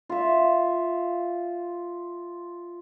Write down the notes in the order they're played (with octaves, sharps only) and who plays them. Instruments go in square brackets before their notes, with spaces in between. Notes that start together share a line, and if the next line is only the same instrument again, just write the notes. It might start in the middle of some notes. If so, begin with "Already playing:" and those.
[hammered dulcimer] F4 E5